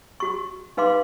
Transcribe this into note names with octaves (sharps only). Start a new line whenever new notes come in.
F#4 C#6
D#4 B4 F5 C6 D6